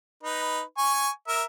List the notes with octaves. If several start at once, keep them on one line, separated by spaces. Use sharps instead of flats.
D#4 B4
G#5 C#6
A#4 E5